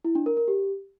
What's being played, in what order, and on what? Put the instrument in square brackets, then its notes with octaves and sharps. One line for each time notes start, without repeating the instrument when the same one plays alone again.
[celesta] E4
D4
A#4
A#4
G4